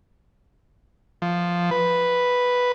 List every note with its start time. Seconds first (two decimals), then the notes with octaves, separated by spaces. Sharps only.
1.22 F3
1.71 B4